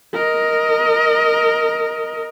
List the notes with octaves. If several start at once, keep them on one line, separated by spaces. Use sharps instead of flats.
A#4 D#5